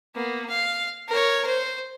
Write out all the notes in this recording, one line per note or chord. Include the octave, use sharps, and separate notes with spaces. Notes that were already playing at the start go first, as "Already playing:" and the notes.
A#3 B3
F5
A#4 C#5
C5